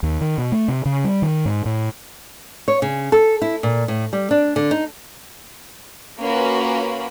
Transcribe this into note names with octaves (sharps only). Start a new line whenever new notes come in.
D#2
D#3
B2
A3
C3
C#3
G3
D#3
G#2
A2
C#5
C#3
A4
E4
A#2
A2
G3
D4
D3
D#4
A#3 C#4 F4 F#4 B4